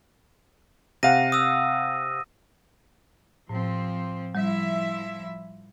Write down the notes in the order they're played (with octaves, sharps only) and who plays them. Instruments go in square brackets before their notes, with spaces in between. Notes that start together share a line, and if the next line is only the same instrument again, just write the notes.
[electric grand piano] C3 F5 F#5 [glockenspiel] A#6 D#7
[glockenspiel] D#6 E6
[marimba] A2 [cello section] F3 C4
[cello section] F3 E4 E5 [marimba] G3